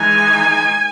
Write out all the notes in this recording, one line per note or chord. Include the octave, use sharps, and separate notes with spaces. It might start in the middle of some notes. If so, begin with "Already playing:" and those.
Already playing: E3 G#3 D#4 G#5